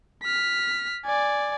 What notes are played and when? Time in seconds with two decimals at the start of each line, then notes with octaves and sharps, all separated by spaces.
0.23 F6 B6
1.05 D5 G#5